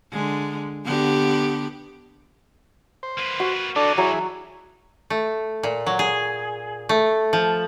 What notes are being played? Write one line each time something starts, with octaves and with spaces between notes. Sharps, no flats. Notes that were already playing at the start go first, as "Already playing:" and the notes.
D3 G#3
D3 B3 G4
C5
A#3 B4
F#4
E3 D4 D#4 A4 D5
F#3 E4 G#4 C#5
A3
A#2
F#3
G#4
A3
F3